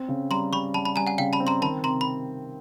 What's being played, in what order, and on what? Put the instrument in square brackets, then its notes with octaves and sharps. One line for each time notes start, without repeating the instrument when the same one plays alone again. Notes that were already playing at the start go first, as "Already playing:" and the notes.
Already playing: [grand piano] C4
C#3
[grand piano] G3 [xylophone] A#5 C6
[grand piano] G3 [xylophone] B5 C#6
[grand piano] G3 [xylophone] A5 B5
[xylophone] A5 B5
[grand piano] G3 [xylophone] G#5 A#5
[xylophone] F#5 G#5
[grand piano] C#3 [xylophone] F5 G5
[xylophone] A5 B5
[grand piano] C4
[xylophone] A#5 C6
[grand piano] D#3 [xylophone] A5 B5
[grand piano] C3 [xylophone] A#5 C6
[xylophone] B5